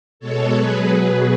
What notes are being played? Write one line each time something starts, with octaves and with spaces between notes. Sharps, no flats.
B2 G#3 A4 C#5
B2 F#3 G#4 B4
B2 F#3